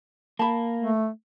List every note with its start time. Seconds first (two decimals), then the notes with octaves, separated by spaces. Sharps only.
0.39 A#3 A5 B5
0.78 A3